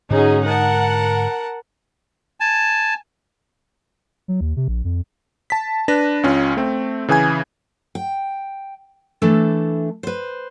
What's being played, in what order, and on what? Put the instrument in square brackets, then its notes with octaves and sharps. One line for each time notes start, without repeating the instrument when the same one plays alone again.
[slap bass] G#2 D3 G#3 [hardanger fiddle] C#4 F#4 [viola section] D#4 G#4
[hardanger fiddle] A#4 A5 [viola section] F#5
[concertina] G#5 A5
[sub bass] F#3
D#2
C3
A#1
F2
[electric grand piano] A5 B6
D4 B4 A#6
C#2 C#4 F4
A3 C4
C#3 E3 G#4 G#5 G#6
[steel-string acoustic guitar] G5
E3 A3 D4 A4
B4 C5